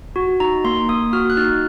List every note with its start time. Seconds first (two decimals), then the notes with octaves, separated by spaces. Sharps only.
0.16 F#4
0.40 D#4 A#5
0.64 A#3 C6
0.89 A#3 D#6
1.13 F#4 F6
1.30 F#6
1.37 D#4 F6